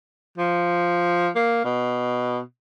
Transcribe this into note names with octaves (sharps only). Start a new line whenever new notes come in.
F3
A#3
B2